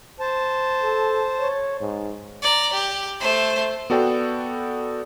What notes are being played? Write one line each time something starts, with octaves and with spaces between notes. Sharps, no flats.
C5 A5
A4
C#5
G#2
D5 A#5
G4
A3 C5
B3 F#4 A4 D5 G5